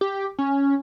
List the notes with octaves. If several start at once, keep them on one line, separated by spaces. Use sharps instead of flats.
G4
C#4